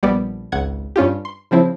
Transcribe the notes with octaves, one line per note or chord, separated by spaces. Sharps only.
A#1 G3 B3 D5
G#1 C#2 F#5 G#6
G2 C#4 F4 G4
C6
C#3 F3 C4 E4